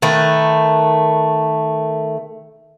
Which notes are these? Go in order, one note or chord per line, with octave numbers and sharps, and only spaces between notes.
D#3 A3 B4